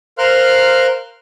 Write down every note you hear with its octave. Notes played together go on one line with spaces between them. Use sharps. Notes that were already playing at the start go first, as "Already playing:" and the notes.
A#4 C5 F5 C6 F6 F#6